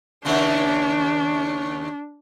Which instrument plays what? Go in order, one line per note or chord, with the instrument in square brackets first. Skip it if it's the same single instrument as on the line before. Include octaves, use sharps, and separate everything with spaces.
[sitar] D#2 C#3 G#3 [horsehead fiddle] D4